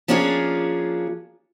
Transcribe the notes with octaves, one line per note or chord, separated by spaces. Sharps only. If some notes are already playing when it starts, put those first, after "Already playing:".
F3 A#3 C#4 D4 F4 G#4